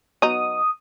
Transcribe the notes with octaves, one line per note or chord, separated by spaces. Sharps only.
F#3 B3 D#4 D#6